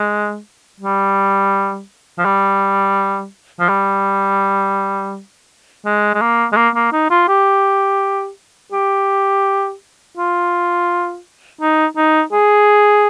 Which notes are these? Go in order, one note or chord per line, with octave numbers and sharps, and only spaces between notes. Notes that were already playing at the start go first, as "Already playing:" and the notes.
Already playing: G#3
G3
F3
G3
F3
G3
G#3
G#3
A#3
G#3
A#3
A#3
D#4
F4
G4
G4
F4
D#4
D#4
G#4